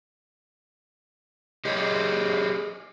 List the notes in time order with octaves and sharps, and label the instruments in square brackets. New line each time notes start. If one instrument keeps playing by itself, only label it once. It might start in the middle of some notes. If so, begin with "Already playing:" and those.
[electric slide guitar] G4 G#4 C#5 D#5